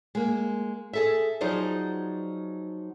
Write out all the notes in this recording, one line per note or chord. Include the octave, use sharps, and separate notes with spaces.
G#3 A#3
G#4 A4 E5
F3 F#3 D#4 G#4 C5 D5